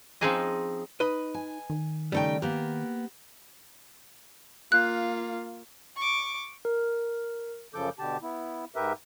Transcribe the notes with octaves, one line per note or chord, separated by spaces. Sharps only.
F3 C4 C#4 D#4 G#4 D#5
D#4 B4 D#5
G#5
D#3
C#3 G3 A3 D#4 G5
A#3 B3 G4
A#3 F4 F#6
C#6 D6
A#4
F#2 C#3 F3 A4 D6 G6
B2 D3 G4 A5
B3 E4
G#2 G4 A#4 B4 E5